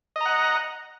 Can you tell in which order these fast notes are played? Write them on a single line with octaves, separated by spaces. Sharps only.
D#5 A#5 F#5